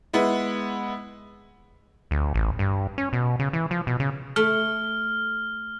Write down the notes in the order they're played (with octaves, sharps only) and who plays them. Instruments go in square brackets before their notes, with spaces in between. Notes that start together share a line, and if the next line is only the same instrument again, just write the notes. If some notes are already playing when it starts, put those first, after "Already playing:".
[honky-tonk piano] G#3 B3 E4
[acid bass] D2
A1
G2
C#4
B2
C#3
E3
F3
B2
C#3
[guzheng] A3 [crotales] F6